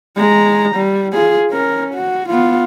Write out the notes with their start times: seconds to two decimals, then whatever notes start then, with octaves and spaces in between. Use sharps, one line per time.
0.16 G#3 A#5
0.75 G3
1.13 F4 G#4
1.51 C#4 A#4
1.95 F#4
2.30 B3 F4